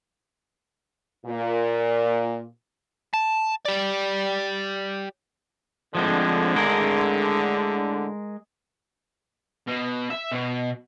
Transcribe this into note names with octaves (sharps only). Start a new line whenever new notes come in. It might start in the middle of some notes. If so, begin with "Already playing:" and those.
A#2
A5
G4 D5
A2 D3 F3 G#3 C4
G#3 G#4 A#4
B2
E5
B2